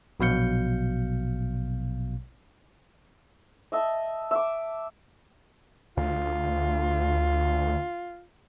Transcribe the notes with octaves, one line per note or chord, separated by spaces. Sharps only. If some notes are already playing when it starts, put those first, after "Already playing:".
A#1 B2 F#3 F5 G6 C#7
D#5 E5 A5
E5 D6
D2 F4